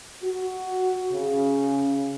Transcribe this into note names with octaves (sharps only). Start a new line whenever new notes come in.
F#4
C#3